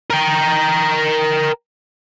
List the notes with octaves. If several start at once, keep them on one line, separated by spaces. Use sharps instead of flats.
A#4 G5